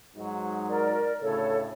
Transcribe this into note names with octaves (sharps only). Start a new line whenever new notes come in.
G#2 F#3 D#4
A#4 D5
D2 A2 C#3 A4 C#5